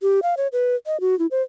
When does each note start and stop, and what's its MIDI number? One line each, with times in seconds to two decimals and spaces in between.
0.02 0.20 67
0.23 0.35 77
0.37 0.47 73
0.53 0.76 71
0.87 1.00 75
1.01 1.17 66
1.19 1.26 64
1.31 1.42 72